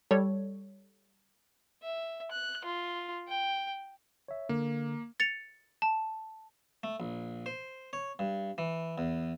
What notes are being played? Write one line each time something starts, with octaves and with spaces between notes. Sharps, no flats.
G3 A4 C#5
E5
F#6
F4
G5
C#5 E5
D3 A#3
A6 C#7 F7
A5
A3
A#1
C5
C#5
G2
E3
E2